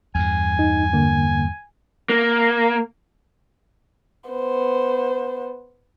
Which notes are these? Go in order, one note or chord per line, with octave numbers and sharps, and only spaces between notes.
E2 G2 G#5
D#4
D3 A#3
A#3
B3 C5